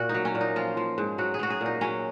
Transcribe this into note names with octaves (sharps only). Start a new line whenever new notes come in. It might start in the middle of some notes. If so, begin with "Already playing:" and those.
Already playing: A#2 F#4
D#4
F#3
C#4
A#2
D#4
F3 F4
F3
G#2
F#3 F#4
G#4
F#3 F#4
G#4
A#2 D#4
F#3 C#4